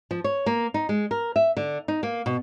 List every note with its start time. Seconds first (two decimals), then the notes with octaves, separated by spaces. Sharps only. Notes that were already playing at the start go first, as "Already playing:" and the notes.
0.11 F3
0.24 C#5
0.46 A#3
0.74 D#4
0.89 G#3
1.11 A#4
1.36 E5
1.57 D3
1.88 D#4
2.03 A#3
2.26 B2